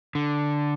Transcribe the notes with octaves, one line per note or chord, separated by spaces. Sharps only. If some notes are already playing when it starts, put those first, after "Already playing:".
D3